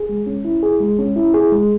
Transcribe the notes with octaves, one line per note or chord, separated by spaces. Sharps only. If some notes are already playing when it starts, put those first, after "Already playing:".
Already playing: G#4
G#3
C#4
E4
G#4
G#3
C#4
E4
G#4
G#3